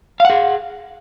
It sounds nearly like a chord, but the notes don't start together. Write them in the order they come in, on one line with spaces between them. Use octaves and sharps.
F5 F#5 G#4